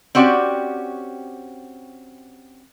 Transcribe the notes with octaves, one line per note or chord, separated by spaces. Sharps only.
C4 C#4 F#4 G4 D5